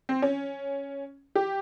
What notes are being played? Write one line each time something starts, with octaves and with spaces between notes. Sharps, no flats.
C4
C#4
G4